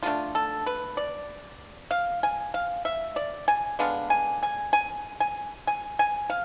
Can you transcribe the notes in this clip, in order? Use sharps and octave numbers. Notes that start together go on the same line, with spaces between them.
D3 A3 D4 F4
A4
B4
D5
F5
G#5
F5
E5
D5
G#5
D3 G#3 B3 D4 F5
G#5
G#5
G#5
G#5
G#5
G#5
F5